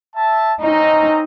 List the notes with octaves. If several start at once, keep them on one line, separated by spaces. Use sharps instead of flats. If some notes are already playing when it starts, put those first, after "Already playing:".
E5 A5
C4 C#4 D#4 A#5